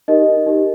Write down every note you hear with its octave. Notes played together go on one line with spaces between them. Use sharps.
D#4 G4 A#4 D#5
D#4 G4 A#4